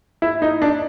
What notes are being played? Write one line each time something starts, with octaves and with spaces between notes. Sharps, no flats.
E4
D#4
D4